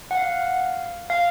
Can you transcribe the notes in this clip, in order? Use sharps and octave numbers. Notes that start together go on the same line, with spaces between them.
F#5
F5
F5